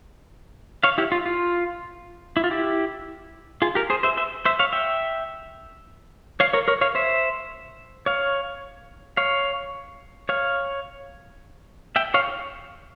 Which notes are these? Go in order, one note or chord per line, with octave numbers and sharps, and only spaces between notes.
C#5 F5
E4 G4
F4
F4
E4
F4
E4 G4
F4 G#4
G4 A#4
G#4 C5
C5 E5
C5 E5
C5 E5
C#5 F5
E5 G5
C#5 F5
A#4 C#5
A#4 C#5
C#5 F5
C5 E5
C#5 F5
C#5 F5
C#5 F5
E5 G5
C#5 F5